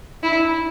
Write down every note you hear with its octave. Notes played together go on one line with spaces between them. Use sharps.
E4